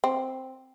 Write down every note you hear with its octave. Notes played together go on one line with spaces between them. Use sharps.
C4